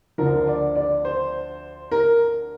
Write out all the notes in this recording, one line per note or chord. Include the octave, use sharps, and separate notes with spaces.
D2 D3 F3 A#4
D5
D5
C5
A#4